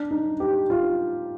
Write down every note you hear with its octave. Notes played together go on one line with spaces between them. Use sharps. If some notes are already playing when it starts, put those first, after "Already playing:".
Already playing: D4
D#4
G4
F4